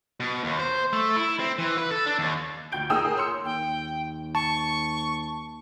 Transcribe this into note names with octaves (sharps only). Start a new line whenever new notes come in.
B2
D#2
C5
A3
E4
C4
E3
B4
A4
D4
D#2
D2 G5 G6 D7
A#3 D#4 G#4 G5 D#6 E6
G#4 A#4
C#5 C6 E6 C#7
D#2 G5
A5 C#6